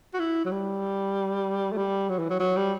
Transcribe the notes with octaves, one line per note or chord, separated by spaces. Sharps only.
F#4
E4
F#3
G3
A3
G3
F#3
E3
F#3
F#3
G3